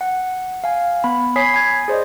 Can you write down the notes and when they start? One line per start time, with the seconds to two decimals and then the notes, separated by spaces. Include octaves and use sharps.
0.01 F#5
0.64 F5 G#5
1.04 B3 B5
1.36 C#5 G#5 B5 D#6 B6 C7
1.54 G#5 G#6
1.88 G#4 C5 D5 D#5